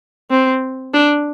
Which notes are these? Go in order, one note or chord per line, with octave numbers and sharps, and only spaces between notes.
C4
D4